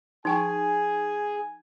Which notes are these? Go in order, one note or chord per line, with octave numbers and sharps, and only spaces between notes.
F3 D#4 G#4 G5 G#5 C#6